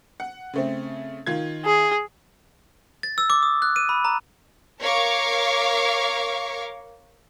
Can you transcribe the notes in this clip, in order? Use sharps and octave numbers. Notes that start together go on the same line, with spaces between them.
F#5
C#3 A3 C4
D#3 F4 G#6
G#4
A6
E6
D6
D#6
F#6
D#7
B5
A#5
A#4 C#5 F5 C#6 D6